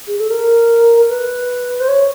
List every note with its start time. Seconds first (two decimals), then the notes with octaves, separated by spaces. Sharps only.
0.07 G#4
0.18 A4
0.30 A#4
1.09 B4
1.80 C5
1.88 C#5